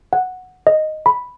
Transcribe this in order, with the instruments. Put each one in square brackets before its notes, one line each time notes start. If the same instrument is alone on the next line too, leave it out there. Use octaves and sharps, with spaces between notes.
[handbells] F#5
D#5
B5